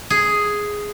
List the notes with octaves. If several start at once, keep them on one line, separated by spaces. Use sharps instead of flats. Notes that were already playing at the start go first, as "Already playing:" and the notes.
G#4